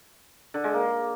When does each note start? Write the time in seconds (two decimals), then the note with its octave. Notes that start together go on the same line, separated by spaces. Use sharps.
0.54 D3
0.64 G#3
0.74 A#3